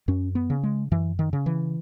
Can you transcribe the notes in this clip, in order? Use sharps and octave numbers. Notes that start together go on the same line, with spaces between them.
F#2 C#4
B3
C#3
G#3
F#2 E3
D#3
C#3
E3